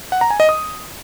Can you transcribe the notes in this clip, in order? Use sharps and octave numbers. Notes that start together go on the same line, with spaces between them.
F#5
A#5
G#5
D#5
D#6